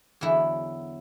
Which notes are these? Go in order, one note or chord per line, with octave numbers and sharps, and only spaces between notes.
E2 D3 F#3 E4